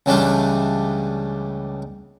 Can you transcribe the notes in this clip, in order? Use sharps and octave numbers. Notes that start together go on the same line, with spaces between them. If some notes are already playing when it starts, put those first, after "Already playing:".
C#2 C#3 E3 G3 A3 D4